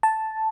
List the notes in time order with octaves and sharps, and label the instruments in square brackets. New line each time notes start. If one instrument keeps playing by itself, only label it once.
[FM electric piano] A5